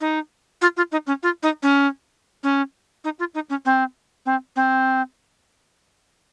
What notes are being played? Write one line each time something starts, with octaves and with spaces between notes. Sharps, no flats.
D#4
F4
F4
D#4
C#4
F4
D#4
C#4
C#4
D#4
F4
D#4
C#4
C4
C4
C4